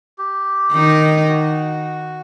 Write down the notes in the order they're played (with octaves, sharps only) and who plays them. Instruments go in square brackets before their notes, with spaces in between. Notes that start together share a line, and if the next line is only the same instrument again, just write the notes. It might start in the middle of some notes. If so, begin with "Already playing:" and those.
[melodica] G4
[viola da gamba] D#3 D#4
[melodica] F#4